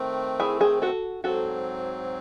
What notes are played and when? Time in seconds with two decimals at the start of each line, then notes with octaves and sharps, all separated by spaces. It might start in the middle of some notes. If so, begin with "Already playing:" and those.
Already playing: D#3 A3 C4
0.40 E4 G#4
0.61 G#4 C5
0.82 F#4 A4
1.24 G#2 F#3 C4 F#4 A4